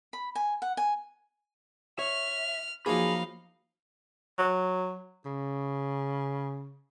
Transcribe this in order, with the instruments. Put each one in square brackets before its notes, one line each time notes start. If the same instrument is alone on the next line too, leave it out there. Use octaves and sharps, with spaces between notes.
[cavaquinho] B5
G#5
F#5
G#5
[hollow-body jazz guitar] C#5 [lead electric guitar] E5 [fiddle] F6
[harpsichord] F3 F#3 A#3 [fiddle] D#4 F5 [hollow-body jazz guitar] G#4 [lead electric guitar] B5
[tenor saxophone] F#3
C#3